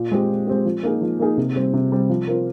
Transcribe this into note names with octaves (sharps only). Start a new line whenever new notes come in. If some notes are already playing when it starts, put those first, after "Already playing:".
Already playing: A#2
G#3 C4 G4
A#2
G#3 C4 G4
F3
A#3 D#4 G#4
F3
A#3 D#4 G#4
C3
G3 C4
C3
G3 C4
F3
C4 F4 A#4